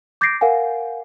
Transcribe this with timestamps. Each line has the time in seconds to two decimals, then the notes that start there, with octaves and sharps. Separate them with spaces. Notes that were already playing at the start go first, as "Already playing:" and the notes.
0.21 D6 G6 A6 A#6 C7 D7
0.41 A#4 F5 F#5 G#5